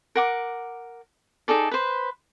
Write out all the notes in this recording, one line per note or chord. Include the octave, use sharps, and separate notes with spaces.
A#4 F#5 D6
D#4 G#4 A4 D5
B4 C5